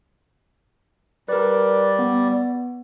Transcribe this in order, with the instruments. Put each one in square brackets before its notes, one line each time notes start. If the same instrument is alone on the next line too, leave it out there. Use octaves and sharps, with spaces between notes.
[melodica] G3 D5 [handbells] A#4 B4
[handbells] B3